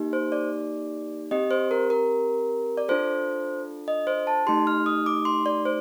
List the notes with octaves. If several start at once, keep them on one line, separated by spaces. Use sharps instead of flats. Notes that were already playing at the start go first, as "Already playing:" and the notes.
Already playing: A#3 D#4 G4
C5
D5
C4 G4 D#5
C5
A#4
A#4
D5
D4 F4 A4 C5
D#5
C5
A5
A3 D#4 G4 C6
F6
D#6
D6
C6
D5
C5